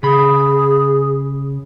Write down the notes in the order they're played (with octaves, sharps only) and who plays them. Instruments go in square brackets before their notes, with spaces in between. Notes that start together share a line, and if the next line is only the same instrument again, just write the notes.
[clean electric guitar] C#3 B5 [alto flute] G#4